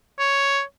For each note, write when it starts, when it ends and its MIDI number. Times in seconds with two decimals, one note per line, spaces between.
0.19 0.61 73